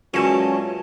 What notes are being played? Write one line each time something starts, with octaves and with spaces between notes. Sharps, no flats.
A#2 E3 F#3 G#3 C#4 C#5 A5